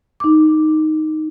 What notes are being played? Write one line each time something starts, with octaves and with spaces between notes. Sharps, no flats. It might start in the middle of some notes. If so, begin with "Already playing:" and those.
D#4 D6